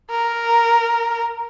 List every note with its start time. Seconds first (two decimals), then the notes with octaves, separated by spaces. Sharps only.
0.10 A#4